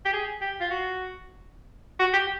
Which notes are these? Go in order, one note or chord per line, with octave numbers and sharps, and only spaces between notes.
G4
G#4
G4
F4
F#4
F#4
G4